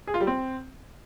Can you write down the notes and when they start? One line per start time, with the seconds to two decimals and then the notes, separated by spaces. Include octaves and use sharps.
0.07 G#4
0.14 F4
0.21 G3
0.27 C4